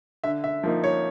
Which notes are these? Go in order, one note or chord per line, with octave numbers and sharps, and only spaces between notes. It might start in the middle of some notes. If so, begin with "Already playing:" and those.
D3 E5
E5
F3 A#3 D#4
C#5